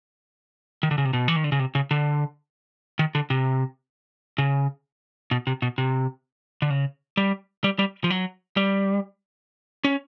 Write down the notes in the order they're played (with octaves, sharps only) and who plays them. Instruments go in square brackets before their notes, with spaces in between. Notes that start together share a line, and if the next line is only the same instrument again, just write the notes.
[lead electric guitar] D#3
D3
C#3
C3
B2
E3
D#3
D3
C#3
C3
C#3
D3
D#3
D3
C3
C#3
B2
C3
B2
C3
D3
C#3
G3
G3
G3
F3
F#3
G3
C#4